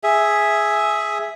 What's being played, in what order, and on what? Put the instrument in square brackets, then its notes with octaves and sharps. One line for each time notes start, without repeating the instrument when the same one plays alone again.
[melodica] G#4 E5